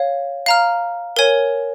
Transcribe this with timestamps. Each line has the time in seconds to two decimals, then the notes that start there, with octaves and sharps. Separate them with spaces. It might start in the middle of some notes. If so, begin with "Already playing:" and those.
Already playing: C#5 F5
0.46 F5 A#5 F6
1.16 A#4 C#5 G#5